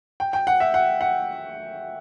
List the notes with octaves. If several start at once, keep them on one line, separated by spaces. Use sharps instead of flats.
G5
G5
F#5
E5
F#5
F#5